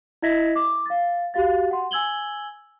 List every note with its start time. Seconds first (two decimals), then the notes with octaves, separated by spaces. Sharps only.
0.22 E4 D#5 E5 G#6 A#6 B6
0.56 D6
0.86 F5 A6
1.34 F#4 G4 F5 A6
1.71 F#5 C6
1.91 G#5 E6 G#6 F#7 G7